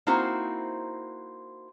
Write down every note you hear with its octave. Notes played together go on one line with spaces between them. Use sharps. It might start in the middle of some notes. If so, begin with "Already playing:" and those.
A#3 C4 D#4 E4 F#4 C5